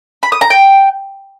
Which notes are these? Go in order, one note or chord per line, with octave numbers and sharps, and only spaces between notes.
B5
D#6
A#5
G5